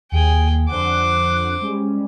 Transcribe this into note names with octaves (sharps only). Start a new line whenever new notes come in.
D#2 G#4 G5
F2 D3 C5 F#5 D6
G3 G#3 C#4